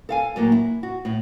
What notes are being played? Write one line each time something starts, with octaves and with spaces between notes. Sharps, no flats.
A4 F5 G#5
A2 F#3 A#3
E4
F#4
A2